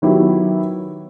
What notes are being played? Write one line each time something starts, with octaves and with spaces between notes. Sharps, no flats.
D#3 F#3 B3 E4 G4